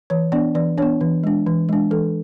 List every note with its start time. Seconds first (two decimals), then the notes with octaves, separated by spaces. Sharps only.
0.10 E3 C#5
0.32 B3 D4 D5
0.55 E3 D5
0.78 B3 D4 C#5
1.01 E3
1.24 G#3 D4
1.46 E3
1.69 G#3 D4
1.91 E3 A4